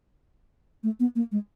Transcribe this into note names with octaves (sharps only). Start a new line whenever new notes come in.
A3
B3
A#3
G#3